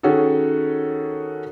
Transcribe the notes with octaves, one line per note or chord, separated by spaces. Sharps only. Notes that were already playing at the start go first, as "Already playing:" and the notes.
D#3 C#4 F#4 G#4 A4